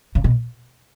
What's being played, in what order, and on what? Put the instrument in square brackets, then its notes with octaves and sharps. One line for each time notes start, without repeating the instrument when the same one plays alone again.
[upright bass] C#3
B2